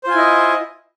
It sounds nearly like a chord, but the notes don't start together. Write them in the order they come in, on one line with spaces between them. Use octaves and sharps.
C5 F4 G#5 E4 D#5